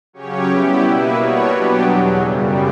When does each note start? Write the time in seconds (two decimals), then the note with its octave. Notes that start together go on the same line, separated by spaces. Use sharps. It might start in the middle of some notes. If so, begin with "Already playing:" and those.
0.13 C#3 F#3 C#4 G4 C#5
0.47 G3 B3 E4 G4
0.82 B2 A#3 E4 B4
1.15 B2 G3 B3 F#4 C#5
1.49 F#3 B3 D4 G4
1.82 E2 B2 F#3
2.16 F#2 C#3 G3